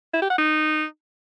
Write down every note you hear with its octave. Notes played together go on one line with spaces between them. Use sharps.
E4
G4
F#5
D#4